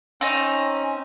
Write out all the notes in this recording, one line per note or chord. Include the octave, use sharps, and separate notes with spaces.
C4 C#4 D#4